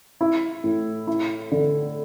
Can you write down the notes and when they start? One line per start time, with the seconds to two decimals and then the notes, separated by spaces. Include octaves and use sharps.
0.21 E4
0.64 A2
1.07 E4
1.51 D3